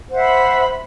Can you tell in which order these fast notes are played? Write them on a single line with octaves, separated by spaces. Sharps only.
C5 F#5 E5 B5